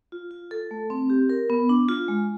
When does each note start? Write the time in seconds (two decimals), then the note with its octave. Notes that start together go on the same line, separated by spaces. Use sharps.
0.12 F4
0.31 F4
0.51 A4
0.71 A3
0.90 C4
1.10 G4
1.30 A#4
1.50 B3
1.69 D4
1.88 F4
2.08 G#3